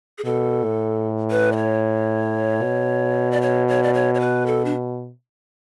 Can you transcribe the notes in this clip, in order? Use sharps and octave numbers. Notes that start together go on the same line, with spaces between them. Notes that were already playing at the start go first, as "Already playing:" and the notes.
G#4
B2 A4
A2
B4
D5
C#5
B2
D5
C#5
C#5
D5
C#5
C#5
B4
A4
D4